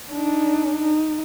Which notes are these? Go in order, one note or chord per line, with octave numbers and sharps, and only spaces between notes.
D4 D#4
D#4